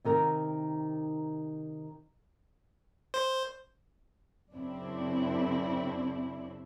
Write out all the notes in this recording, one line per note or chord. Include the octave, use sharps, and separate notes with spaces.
C3 D#3 A#4
C5
F#2 C#3 C4 D4 E4